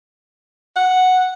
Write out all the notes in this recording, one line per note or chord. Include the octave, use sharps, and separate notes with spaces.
F#5